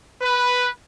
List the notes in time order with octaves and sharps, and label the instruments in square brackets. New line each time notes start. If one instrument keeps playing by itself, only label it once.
[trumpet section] B4